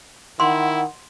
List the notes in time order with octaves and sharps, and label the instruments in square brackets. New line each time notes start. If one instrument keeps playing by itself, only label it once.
[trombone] D#3 [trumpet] E4 [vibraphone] F#5 [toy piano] C6